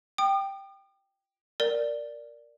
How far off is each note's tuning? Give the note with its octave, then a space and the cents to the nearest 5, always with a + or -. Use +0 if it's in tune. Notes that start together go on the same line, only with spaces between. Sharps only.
G5 +0 D#6 -45
A#4 +0 D5 +0